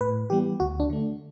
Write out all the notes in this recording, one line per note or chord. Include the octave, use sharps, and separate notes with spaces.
A2 B4
E3 G3 B3 G4
D2 F#4
D4
D3 A3